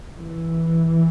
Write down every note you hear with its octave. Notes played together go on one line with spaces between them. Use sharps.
E3